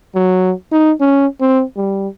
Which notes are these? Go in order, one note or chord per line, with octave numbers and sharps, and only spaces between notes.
F#3
D#4
C#4
C4
G3